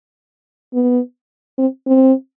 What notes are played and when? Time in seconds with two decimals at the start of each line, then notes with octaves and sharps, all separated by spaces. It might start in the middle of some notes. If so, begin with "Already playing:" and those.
0.74 B3
1.58 C4
1.87 C4